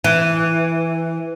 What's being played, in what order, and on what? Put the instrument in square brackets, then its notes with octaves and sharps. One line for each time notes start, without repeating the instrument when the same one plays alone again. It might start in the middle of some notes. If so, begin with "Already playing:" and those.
[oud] E3